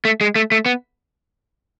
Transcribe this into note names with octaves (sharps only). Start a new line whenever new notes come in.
A3
G#3
A3
A3
B3